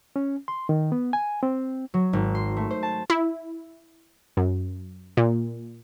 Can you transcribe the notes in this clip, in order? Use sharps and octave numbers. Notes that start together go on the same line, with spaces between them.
C#4
C6
D#3
B3
G#5
C4
F#3
G#1
C6
A3
C5
A5
E4
F#2
A#2